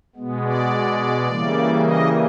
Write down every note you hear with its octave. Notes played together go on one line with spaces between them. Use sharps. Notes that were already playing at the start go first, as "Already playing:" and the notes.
B2 G#3 B3
D5
C#3 E3 G3 A#3
D#5